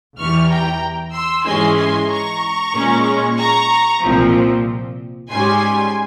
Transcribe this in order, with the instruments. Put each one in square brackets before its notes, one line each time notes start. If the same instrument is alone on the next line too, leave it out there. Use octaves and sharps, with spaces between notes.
[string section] E2 E3 G3 C#6 F6
G5 A#5
C6 E6
G#2 E3 G#3 C#4 G#5 C6
G#5 C6
A#5 C#6
A#2 G#3 C#4
A#5 C#6
C2 A#2 F3 C4
G#2 G3 C#4 G#5 C6